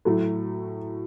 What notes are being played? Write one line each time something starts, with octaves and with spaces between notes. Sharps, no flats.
A2 F#3 A3